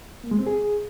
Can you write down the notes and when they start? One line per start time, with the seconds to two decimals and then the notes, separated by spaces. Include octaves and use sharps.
0.24 A#3
0.31 G#3
0.39 C4
0.47 G#4